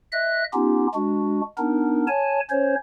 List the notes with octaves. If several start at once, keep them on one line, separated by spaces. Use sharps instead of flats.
D#5 E5 F#6
B3 C#4 D#4 F4 G4
G#3 D4 F#4
B3 D4 D#4 A#4
C#5 G#5 A5
C#4 C5 C#5